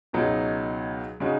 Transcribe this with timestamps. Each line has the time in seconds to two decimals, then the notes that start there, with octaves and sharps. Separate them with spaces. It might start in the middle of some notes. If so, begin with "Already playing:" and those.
0.13 C#2 B2 F#3 D#4 F#4
1.20 C#3 G#3 D#4 F#4